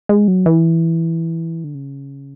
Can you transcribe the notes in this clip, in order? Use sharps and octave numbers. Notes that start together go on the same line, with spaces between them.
G#3
F#3
E3
D3
C#3